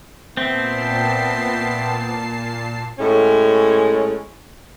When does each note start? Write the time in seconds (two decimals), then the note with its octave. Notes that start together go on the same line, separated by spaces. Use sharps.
0.37 A#2 B3 C4 E5 G5 A5 C6 C7
2.98 A2 G#3 C#4